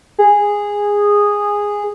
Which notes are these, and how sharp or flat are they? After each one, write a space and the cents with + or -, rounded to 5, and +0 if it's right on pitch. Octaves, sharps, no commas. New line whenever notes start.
G#4 -10